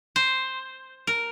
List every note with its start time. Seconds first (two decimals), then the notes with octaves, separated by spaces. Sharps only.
0.16 C5
1.07 A#4